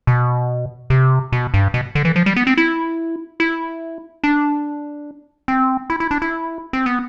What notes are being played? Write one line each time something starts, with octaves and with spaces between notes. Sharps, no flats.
B2
C3
B2
G2
B2
D3
E3
F3
G3
B3
C4
E4
E4
D4
C4
E4
E4
D4
E4
C4
B3